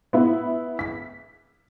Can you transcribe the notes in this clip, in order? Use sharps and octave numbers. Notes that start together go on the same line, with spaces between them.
B3 E4
B6